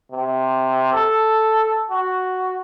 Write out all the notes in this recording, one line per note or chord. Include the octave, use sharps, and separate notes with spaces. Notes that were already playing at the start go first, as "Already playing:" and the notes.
C3
A4
F#4